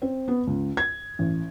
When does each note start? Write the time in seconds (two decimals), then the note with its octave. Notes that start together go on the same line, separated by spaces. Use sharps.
0.02 C4
0.28 B3
0.47 C#2
0.77 G#6
1.19 A1